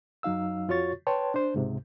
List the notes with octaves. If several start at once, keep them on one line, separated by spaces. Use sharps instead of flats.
F#2 F#3 D#4 F5 E6
F2 F4 F#4 C#5 C#6 A6
B4 C#5 G5 A5 C6
D4 C5
C#2 G#2 C3